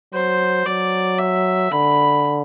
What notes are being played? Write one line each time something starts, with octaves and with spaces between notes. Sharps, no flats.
F#3 C5
F#3 D5
E5
D3 B5